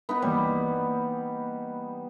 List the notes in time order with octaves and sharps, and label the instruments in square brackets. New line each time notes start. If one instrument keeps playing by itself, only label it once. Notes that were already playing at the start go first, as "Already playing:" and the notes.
[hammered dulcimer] B3 D#4 B4
[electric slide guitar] E3 A#3 C#5 [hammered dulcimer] G3